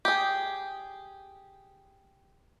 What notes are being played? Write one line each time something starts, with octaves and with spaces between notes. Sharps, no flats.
G4 G#4